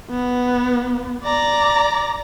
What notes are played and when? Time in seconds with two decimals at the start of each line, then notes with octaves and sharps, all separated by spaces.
0.10 B3
1.24 D5 A#5